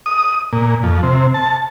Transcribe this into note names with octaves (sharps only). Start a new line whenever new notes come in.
D#6
A#2
F2
C3
A5